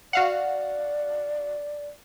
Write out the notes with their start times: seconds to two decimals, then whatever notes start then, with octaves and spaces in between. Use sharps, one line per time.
0.13 F#4 D5 F5 F#5